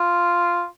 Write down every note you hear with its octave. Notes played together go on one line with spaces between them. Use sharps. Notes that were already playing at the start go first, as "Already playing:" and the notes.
Already playing: F4